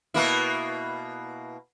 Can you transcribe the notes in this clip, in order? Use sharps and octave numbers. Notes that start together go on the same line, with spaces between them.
B2 A#3 E4